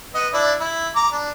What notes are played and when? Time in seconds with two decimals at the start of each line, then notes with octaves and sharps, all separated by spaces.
0.15 B3 D#5
0.33 D4 E4 D5
0.60 E4
0.96 A#5 D6
1.12 D4